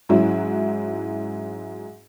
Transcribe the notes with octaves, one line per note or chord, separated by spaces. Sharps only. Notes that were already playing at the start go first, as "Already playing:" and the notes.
G#2 F#3 C#4 E4 F#4